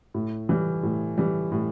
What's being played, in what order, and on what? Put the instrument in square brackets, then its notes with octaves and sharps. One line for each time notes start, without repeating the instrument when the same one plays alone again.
[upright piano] A2
E3 G3
A2
E3 G3
A2